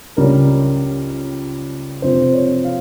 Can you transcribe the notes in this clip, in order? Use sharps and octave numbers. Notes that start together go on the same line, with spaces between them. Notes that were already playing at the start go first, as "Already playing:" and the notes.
C#2 C#3 G3 C#4 A#4
F2 C3 F3 C4 C5
C#5
F5